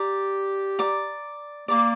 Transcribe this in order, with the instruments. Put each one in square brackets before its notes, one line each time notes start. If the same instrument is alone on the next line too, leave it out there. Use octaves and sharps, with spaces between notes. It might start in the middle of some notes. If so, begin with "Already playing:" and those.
Already playing: [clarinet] G4 [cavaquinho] D5 A#5 D6
[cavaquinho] D5 A#5 D6
[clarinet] A#3 [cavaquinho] D5 A#5 D6